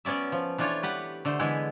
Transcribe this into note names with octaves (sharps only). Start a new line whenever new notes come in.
F#3 B3 C#4 D5 E5
F3
E3 A3 D4 F4 C#5
G4 B4 F#5
D3 A3 C5
D3 E3 G#3 B3 E4